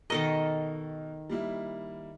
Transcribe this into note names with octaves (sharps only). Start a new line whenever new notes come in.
B2 D#3 A4 A#4 D#5 A#6
G3 A#3 E4